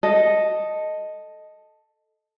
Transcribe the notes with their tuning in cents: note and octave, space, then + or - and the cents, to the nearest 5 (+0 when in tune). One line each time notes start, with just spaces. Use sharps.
A4 +0 D#5 +0